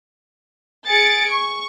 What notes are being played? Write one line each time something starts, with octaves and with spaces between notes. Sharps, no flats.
G#4 A6 C#7 D7
C#6